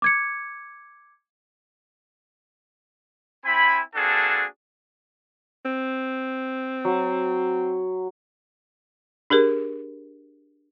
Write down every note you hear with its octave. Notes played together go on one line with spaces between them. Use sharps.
D6 G#6 C#7
C4 E4 G#5 B5
A#3 C4 D4 F#4 G#4 A4
C4
F#3
D4 G4 G#4 A#4